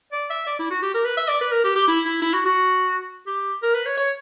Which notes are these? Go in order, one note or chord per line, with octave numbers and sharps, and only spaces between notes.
D5
E5
D5
E4
F#4
G4
A#4
B4
E5
D5
B4
A#4
G4
G4
E4
E4
E4
F#4
F#4
G4
A#4
B4
C#5
C#5